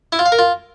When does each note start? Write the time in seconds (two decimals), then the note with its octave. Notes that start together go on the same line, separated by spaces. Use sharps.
0.12 E4
0.19 F4
0.26 F5
0.32 A#4
0.39 F4